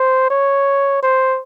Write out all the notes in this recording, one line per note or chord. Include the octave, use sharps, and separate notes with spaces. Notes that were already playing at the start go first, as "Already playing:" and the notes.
Already playing: C5
C#5
C5